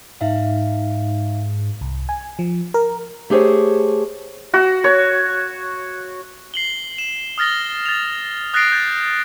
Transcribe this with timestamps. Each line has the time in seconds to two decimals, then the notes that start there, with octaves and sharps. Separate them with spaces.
0.21 G#2 D#4 E5 F5
1.81 C2
2.09 G#5
2.39 F3
2.74 A#4
3.30 A3 G4 G#4 C5 C#5
4.54 F#4
4.84 C#5
6.54 C7 F#7 G7
6.98 E7
7.38 D#6 F6 A6 A#6 G7
7.85 A6 F7
8.54 D#6 F#6 A6 A#6 C7 D7
8.72 G6 A6